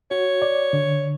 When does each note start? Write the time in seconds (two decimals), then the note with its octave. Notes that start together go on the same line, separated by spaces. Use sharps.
0.11 F#4 C#5
0.42 D5
0.73 D3